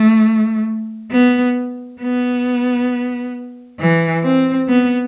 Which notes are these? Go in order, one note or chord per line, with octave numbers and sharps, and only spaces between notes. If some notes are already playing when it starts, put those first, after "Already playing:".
Already playing: A3
B3
B3
E3
C4
B3